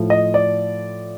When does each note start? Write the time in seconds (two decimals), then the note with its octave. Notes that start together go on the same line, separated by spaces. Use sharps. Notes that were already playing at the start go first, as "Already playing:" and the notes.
Already playing: A2 F3
0.10 D#5
0.34 D5